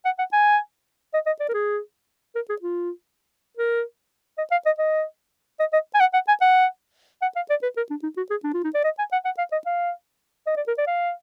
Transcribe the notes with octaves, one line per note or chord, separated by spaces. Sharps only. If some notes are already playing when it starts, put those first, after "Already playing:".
F#5
F#5
G#5
D#5
D#5
D5
A#4
G#4
A#4
G#4
F4
A#4
D#5
F5
D#5
D#5
D#5
D#5
G#5
F#5
F#5
G#5
F#5
F#5
F5
D5
B4
A#4
D4
D#4
F#4
G#4
D4
F4
D#4
D5
D#5
G#5
F#5
F#5
F5
D#5
F5
D#5
D5
A#4
D5
F5